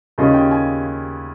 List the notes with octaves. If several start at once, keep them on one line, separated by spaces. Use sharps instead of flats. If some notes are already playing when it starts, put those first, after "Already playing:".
D#2 C#3 G3 C#4 F4 D#5
G5
G#5